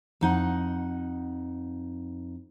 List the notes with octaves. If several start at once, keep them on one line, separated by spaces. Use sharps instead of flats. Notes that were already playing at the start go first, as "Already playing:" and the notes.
F2 D#4 F#5